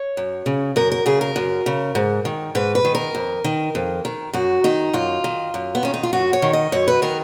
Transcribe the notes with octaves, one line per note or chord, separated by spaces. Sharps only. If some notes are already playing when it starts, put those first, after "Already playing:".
Already playing: C#5
F#2
C#3
F#2 A#4
A#4
C#3 G#4
A#4
F#2
C#3
G#2
D#3
G#2 B4
B4
D#3
A#4
F2
D#3
F2
D#3
F#2 F#4
D#3 D#4
F#2 F4
D#3
F#2
B3
D#3 C#4
D#4
F4
F#2 F#4
C#5
D#3
D#5
F#2 C#5
B4
D#3 A#4